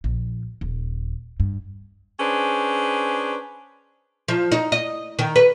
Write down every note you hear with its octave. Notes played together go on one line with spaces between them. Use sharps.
A#1
D#1
G2
C#4 D4 G#4 B4 C5
F3
D#4
D#5
D#3
B4